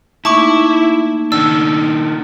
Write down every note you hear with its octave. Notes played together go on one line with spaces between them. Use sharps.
A3 A#3 D#4 E4 A5 C#6 D6
D#3 D4 E6